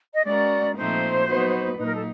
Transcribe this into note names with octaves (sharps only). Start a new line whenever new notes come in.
D#5
G#3 C#4 F#4 A#4 D5
A#2 F3 A3 C4 D#4 C5
F#3 B3 D#4 F#4 B4
A#2 F#3 A#3 D#4 B4
A#4
A4